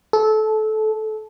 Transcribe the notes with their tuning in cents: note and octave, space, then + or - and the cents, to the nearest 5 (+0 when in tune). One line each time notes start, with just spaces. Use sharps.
A4 -20